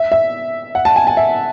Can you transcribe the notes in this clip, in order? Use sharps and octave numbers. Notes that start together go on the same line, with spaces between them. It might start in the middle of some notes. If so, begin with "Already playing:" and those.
Already playing: E5
E5
F#5
A5
G#5
G#5
E5